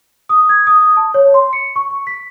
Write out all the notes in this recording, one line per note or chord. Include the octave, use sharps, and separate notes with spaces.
D#6
G#6
D#6
A5
C#5
C6
C#7
C#6
C#6
B6